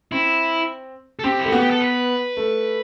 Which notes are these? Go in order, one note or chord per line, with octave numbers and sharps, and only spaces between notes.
C4 E4
A4
C4 G4
E4
A3
B3 F#4
G4
A4
B4
A3